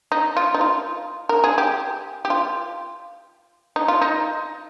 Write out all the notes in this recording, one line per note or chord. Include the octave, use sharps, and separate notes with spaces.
D#4
F4
D#4
F4
A#4
G#4
G4
G4
F4
D#4
F4
D#4